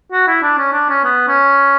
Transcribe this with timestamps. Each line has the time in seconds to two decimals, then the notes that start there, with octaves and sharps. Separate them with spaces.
0.12 F#4
0.28 E4
0.43 D4
0.58 C#4
0.73 D4
0.89 C#4
1.04 B3
1.28 C#4